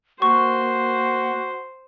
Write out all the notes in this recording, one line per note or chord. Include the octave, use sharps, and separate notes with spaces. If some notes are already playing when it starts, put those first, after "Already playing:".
A#3 F#4 C5 C#6